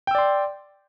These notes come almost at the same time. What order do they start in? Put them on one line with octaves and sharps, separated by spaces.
G5 E6 D5 C6